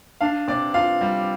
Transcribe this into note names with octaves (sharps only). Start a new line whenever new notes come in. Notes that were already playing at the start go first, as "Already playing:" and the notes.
D4 F5
C3 D5
F4 F5
G3